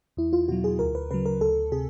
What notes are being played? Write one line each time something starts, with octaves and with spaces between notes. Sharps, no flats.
E2 E4
F4
B2 F#3 F#4
G#4
D2 A#4
B4
C#3 F#3 B4
A#4
D2 A4
C3 G#4